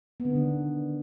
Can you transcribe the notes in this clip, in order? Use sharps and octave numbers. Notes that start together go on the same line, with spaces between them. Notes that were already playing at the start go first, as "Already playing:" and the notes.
B3
D3
D4
D#3